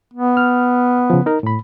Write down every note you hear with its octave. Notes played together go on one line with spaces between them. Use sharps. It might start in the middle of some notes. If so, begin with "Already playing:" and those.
B3
F6
C#3 F3
D#4 A#4
A2 B5